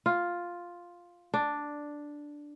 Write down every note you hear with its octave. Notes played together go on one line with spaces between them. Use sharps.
F4
D4